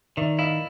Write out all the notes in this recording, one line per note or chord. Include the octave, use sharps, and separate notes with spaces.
D#3 D5 E5
E4 D#5 F5